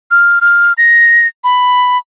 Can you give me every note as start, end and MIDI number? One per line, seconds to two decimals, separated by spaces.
0.11 0.39 89
0.41 0.73 89
0.78 1.27 94
1.44 1.98 83